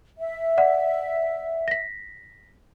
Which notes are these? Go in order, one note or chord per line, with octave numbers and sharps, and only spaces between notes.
E5
D5 F#5
A#6 B6